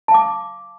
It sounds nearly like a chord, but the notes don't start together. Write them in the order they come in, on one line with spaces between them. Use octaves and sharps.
A5 F5 D6